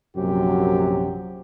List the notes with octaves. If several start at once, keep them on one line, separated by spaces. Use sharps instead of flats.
A#1 F#2 C3 F#3 G4